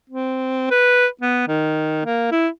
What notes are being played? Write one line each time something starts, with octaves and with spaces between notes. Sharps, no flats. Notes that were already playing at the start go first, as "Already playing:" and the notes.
C4
B4
B3
D#3
A#3
E4